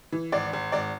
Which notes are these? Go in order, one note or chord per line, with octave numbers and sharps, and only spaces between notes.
E3
G#1 D5
G#1
G#1 D5